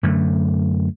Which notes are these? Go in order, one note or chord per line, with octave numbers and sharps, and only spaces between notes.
F#2 D3 A3